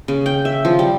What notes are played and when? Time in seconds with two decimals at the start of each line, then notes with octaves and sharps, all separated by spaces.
0.08 C#3
0.26 G5
0.45 E5
0.65 F3
0.79 G3